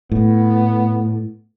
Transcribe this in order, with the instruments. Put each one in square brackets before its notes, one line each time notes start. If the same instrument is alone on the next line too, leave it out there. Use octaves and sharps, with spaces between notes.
[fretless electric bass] A2 [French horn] B3